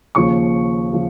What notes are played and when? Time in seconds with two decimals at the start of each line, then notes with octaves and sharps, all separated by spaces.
0.15 D#2 C#3 F3 C#6
0.93 C#3 F3